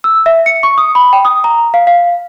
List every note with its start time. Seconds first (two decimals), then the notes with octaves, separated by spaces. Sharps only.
0.04 E6
0.26 E5
0.46 C#7
0.63 C#6
0.78 D#6
0.95 B5
1.13 G5
1.25 D#6
1.44 A#5
1.74 F5
1.87 F5